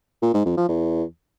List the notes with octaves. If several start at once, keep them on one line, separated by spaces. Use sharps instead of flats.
A#2
G#2
F2
F3
E2